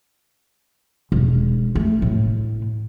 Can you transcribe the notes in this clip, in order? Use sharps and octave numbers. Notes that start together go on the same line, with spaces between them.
E1
A3
A2